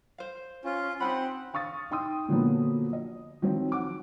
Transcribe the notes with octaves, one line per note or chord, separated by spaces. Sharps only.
C5 F5
C#4 F4
C4 D#4 G4 F#5 B5
F5 C#6 D#6 A6
D#4 G5 C6 D#6
A#2 D3 F3 F#3 A#3 B3
D#5
D#3 F3 F#3 C4 F4
F#5 D6